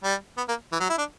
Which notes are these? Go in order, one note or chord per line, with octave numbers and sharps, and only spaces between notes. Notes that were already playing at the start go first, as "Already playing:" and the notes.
G3
B3
A#3
E3
F#3
E4
D4